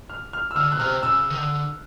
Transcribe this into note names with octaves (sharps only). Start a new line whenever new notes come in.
F6
F6
E6
D3 F6
F#6
B2
C3 F6
C#3 E6
D#3
D3